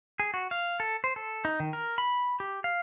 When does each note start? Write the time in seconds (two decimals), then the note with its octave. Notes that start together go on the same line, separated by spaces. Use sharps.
0.20 G#4
0.34 F#4
0.51 F5
0.80 A4
1.04 C5
1.16 A4
1.45 D#4
1.60 D#3
1.73 A#4
1.98 B5
2.40 G4
2.64 F5